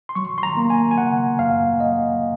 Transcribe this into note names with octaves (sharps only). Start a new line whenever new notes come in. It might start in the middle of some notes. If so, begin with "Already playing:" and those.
C6
F#3 C#6
C6
A#5
A#3
G#5
G#5
C#3 F#5
F#2 F5
F#3 D#5